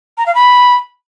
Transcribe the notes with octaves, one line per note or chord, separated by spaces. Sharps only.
A#5
F5
B5